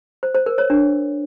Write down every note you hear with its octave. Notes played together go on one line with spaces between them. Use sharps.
C5
C5
A#4
C#5
D4